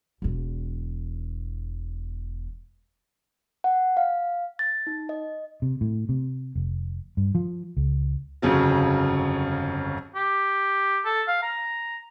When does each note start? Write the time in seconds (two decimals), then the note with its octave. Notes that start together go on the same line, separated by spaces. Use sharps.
0.22 E1 E2
3.64 F#5
3.97 F5
4.59 A6
4.87 D#4
5.09 D#5
5.62 C3
5.81 A2
6.09 C3
6.55 F1
7.17 G2
7.35 F3
7.77 C#2
8.42 G1 F2 C#3 F#3
10.15 G4
11.05 A4
11.28 F5
11.42 A#5